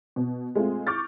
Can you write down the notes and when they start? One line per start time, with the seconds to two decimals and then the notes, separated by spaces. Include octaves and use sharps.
0.16 B2
0.55 G#3 A3 C4 F4
0.87 C#6 D6 F6 G6 A6